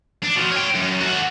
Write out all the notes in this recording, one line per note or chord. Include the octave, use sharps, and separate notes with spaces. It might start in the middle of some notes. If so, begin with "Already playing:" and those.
D4
B2 F3
C#5 G5
F#2
F#4 A4